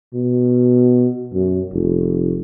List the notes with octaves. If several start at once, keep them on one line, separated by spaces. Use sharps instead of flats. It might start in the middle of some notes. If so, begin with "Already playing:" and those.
B2
F#2
F1